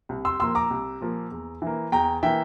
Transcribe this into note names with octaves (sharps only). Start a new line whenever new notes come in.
C2
C6 E6
A#2 F3 A#3 C6 E6
A#5 D6
C2
A#2 F3 A#3
E2
E3 A#3
E2 G5 A#5
E3 A#3 E5 G5